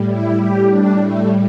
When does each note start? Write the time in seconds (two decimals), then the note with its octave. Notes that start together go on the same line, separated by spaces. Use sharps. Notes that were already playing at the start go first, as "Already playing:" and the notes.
Already playing: A2 G3
0.09 E4
0.39 G4
0.69 D4
0.99 A3